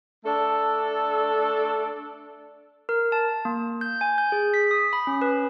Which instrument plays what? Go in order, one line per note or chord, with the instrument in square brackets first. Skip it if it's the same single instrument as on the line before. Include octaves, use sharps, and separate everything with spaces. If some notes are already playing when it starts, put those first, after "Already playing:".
[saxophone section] A3 D4 A4
[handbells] A#4
A5
A#3
G6
G#5
G6
G#4
B6
D#6
B5
C#4
B4